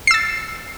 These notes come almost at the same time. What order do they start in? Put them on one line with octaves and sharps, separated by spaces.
C7 E6 A6